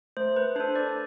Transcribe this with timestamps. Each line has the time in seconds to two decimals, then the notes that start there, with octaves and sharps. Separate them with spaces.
0.17 A3 C5
0.36 B4
0.56 D4 A4 C5
0.76 D5